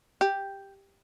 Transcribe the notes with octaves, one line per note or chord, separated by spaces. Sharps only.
G4